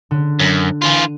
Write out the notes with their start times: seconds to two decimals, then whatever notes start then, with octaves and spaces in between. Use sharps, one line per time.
0.11 D3
0.39 F#2
0.82 E3 F4